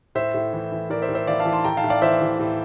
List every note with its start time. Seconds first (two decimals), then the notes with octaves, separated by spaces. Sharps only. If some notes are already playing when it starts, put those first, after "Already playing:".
0.15 A2 C5 E5
0.34 A2
0.53 E3
0.72 E3
0.90 A2 A#4 D5
1.02 C5 E5
1.09 A2
1.15 C5 E5
1.27 E3 D5 F5
1.40 F5 A5
1.45 E3
1.52 A5 C6
1.64 A2 G5 A#5
1.77 F5 A5
1.84 A2
1.90 D5 F5
2.02 E3 C5 E5
2.21 E3
2.40 A2